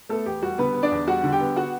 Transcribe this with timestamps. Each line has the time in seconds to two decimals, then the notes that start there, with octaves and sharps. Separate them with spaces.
0.09 A3 B3 A4
0.26 E2 G4
0.42 G3 F#4
0.58 D3 B3 B4
0.74 B3
0.83 D4 D5
0.92 E2
1.08 G3 F#4 F#5
1.24 D3
1.32 G4 G5
1.40 B3
1.56 F#4 F#5